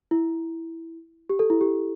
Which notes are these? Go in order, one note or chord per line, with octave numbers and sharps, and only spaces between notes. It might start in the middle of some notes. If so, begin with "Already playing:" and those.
E4
G4
A4
E4
G4